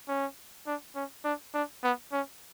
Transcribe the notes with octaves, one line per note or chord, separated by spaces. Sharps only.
C#4
D4
C#4
D4
D4
B3
C#4